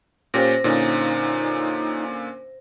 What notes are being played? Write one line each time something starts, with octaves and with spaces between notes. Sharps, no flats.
A#2 C#4 G4 C5 A#6
A#2 D3 C#4 D#4